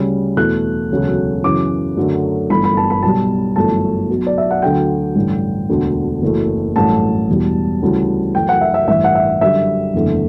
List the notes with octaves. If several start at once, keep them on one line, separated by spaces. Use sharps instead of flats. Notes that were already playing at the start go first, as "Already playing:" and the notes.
Already playing: D2 C#3 G3
E2 B2 A3 F#6
E1 D2 C#3 F#3 A3
F#2 C#3 E3 D6
F#2 D3 F#3 A3
G1 G2 E3 A3 B5
B5
A5
B5
B1 B2 G3 A5
G1 F#2 E3 A3 A5
B1 B2 F#3
D5
E5
F#5
D2 D3 F#3 G5
A1 G2 D3
E1 D2 D3
F#1 F#2 E3 A3
A1 G2 F#3 A3 A5
E1 E2 B2 G3
D2 C#3 E3 G3
F#2 E3 A3 G5
F#5
E5
E5
A1 G2 E3 E5
F#5
E5
F#2 D3 G3 E5
F#1 E2 D3 A3